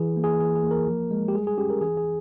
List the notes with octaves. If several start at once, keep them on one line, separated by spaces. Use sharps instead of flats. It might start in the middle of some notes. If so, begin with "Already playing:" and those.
Already playing: E3 G#4
A#3
G#4
E3 G#4
G#4
A#3
A#4
F3
G#3
G4
G3 G#4
G#4
C#4 G4
A#4
E3 G#4
G#4